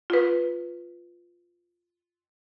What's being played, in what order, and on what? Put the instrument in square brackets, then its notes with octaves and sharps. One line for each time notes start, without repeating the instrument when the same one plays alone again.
[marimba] F4 B4